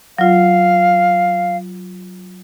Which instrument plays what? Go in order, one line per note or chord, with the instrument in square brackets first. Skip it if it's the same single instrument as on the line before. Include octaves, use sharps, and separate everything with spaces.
[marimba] F#3 F4 [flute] F5